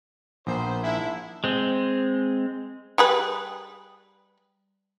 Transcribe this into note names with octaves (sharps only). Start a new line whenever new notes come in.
A#1 B3 A#4 C5
G#2 D4 E4
G#3 C4
G3 G#4 B4